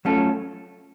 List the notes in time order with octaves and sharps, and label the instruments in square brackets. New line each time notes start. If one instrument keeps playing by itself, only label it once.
[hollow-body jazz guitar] F#3 A3 C#4 F4 A4